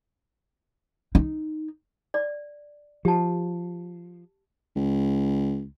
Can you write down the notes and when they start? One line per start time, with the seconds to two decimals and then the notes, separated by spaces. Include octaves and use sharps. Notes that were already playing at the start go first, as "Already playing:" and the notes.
1.15 D#4
2.14 D5
3.05 F3 G4 A5
4.76 C#2